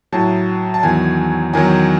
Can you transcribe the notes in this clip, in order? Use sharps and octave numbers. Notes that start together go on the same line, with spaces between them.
A2 F#3 A5
A5
E2 D#3 F#3 G#5
E2 D#3 F#3 G#5